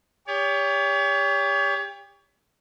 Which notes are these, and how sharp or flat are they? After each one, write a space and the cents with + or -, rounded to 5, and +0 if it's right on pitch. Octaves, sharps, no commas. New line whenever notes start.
G4 +35 C#5 +35